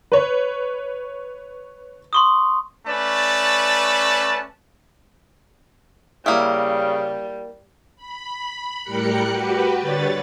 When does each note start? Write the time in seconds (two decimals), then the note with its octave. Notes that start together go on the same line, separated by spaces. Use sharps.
0.12 B4 C#5
2.13 C6 C#6 D#6
2.86 A3 C#4 B4 D5 A5
6.26 C#3 G3 A#3 E4
7.96 B5
8.82 A2 G3 G4 A#4 F#6 C#7
9.29 F#4 G4 B4
9.76 D3 G3 B4 C#5 A6